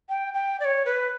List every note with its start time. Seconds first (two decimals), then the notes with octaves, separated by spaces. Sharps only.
0.09 G5
0.34 G5
0.60 D5
0.65 C#5
0.85 B4